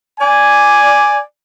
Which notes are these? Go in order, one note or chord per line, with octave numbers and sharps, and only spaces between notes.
D5 G#5